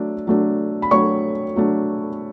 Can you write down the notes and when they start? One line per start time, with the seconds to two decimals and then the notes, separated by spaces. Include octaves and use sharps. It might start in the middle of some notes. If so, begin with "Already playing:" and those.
Already playing: F#3 A3 D4
0.27 F#3 A3 D4
0.82 B5
0.91 F#3 A3 D4 C#5 C#6
1.56 F#3 A3 D4